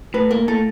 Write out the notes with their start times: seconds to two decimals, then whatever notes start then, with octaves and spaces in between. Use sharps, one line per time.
0.14 A2 B4
0.31 A#3 A#4
0.48 A2 A4